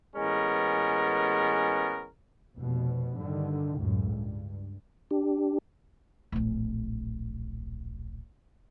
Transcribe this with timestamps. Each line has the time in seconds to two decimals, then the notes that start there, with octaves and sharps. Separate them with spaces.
0.16 A1 G#3 B3 C#4 A#4
2.58 F1 B2
3.19 G2 D3 D#3
3.77 C#2 F#2 A2
4.13 G2
5.11 D4 G4
6.32 D1 A#1